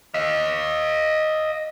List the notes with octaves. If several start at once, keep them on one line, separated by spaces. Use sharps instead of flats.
D#5 F5